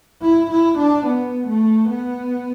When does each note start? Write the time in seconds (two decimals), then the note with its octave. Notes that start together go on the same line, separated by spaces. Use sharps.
0.22 E4
0.51 E4
0.79 D4
1.06 B3
1.48 A3
1.90 B3